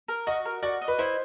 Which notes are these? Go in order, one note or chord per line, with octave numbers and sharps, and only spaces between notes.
A#4
F#4 D#5
A#4
F#4 D5
D#5
B4
E4 C5